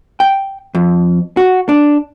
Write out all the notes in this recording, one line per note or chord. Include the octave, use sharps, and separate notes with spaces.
G5
F2
F#4
D4